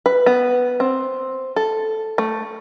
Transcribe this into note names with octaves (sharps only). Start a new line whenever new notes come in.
B4
B3
C4
A4
A3